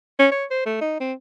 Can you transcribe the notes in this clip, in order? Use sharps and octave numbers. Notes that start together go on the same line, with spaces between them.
C#4
C#5
C5
A3
D#4
C4